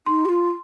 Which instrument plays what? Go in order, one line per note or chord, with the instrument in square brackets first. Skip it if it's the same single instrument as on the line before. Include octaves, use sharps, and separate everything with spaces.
[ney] D#4 [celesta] C6
[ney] G4
F4